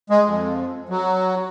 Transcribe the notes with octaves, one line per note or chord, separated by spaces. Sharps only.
G#3
F2
F#3